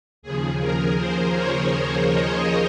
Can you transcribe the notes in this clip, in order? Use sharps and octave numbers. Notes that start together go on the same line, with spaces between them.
D#2 C#3 F3 G#4
A#4
C5
C#5
C#5
D#5